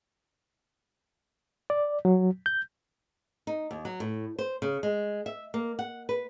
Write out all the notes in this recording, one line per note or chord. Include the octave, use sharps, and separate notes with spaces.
D5
F#3
G6
D#4
D#2
F#3
A2
C5
C#3
G#3
E5
A#3
F#5
B4